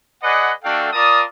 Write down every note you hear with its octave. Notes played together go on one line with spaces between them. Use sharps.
G#4 B4 D5 D#5 F#5
A3 D4 F#4 A4 F5 G5
F4 A#4 D5 A5 D#6